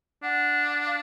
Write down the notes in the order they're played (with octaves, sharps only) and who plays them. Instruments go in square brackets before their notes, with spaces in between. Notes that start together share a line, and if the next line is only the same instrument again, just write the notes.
[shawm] D4 [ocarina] F#5
[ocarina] F5